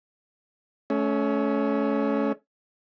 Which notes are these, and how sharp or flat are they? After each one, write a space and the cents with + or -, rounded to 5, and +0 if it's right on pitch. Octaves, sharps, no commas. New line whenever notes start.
A3 -30 C#4 +10